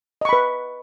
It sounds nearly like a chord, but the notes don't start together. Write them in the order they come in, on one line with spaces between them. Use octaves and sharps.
D#5 C#6 B5 B4